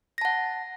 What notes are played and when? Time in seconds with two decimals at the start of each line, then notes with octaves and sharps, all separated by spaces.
0.18 A#6
0.21 A5
0.25 F#5